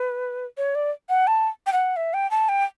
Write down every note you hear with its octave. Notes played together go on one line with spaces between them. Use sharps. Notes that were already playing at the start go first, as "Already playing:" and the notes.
Already playing: B4
C#5
D5
F#5
A5
G5
F#5
E5
G5
A5
G5